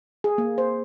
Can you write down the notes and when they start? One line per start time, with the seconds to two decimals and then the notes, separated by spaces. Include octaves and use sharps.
0.24 G#4
0.38 A#3
0.58 C5